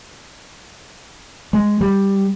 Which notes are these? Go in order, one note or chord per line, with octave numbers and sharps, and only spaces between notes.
G#3
G3